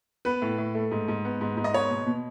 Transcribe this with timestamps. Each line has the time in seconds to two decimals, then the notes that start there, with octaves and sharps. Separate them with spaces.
0.25 B3 B4
0.42 A2
0.58 A2
0.75 A3
0.91 G#2
1.08 G#2
1.25 B3
1.41 G#2
1.57 G#2
1.64 D#5
1.74 B3 C#5
1.90 B2
2.07 B2